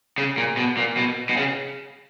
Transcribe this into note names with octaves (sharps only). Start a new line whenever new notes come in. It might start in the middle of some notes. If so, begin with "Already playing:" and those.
C#3
A#2
B2
A#2
B2
B2
C#3